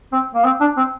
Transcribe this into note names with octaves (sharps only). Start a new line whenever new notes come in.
C4
A#3
C4
D4
C4